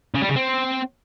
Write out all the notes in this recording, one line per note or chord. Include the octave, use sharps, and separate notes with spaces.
C#3
G3
C#3
C4